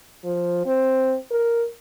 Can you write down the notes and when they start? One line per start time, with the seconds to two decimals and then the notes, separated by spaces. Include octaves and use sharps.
0.24 F3
0.66 C4
1.31 A#4